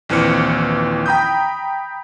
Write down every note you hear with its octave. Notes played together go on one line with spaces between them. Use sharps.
A#1 D#2 E3 C4 F6 C#7
G5 A#5 B5 D#6 G6